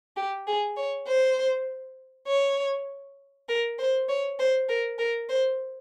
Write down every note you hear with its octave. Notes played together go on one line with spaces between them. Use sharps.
G4
G#4
C#5
C5
C#5
A#4
C5
C#5
C5
A#4
A#4
C5